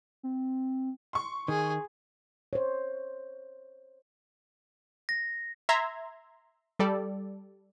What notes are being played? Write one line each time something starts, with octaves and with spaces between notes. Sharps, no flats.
C4
C6 C#6
D#3 G#4
C5 C#5
A#6
E5 A#5 C6 G#6
G3 A4 D5